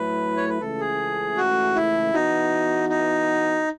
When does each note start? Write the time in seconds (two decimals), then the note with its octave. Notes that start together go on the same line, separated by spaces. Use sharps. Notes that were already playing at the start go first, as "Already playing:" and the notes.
Already playing: A2 F#3 A3 E4 B4
0.37 C#5
0.49 B4
0.61 C#2 C#3 E3 A3 A4
0.80 G#4
1.37 F#4
1.76 E4
2.13 E3 B3 D#4 F#4
2.89 D#4